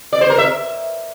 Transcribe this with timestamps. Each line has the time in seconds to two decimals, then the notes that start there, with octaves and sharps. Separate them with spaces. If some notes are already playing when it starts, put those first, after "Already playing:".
0.13 D5
0.21 C5
0.30 A#4
0.38 E5